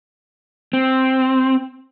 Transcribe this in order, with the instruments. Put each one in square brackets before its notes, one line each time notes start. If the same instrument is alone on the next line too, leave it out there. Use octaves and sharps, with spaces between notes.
[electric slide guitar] C4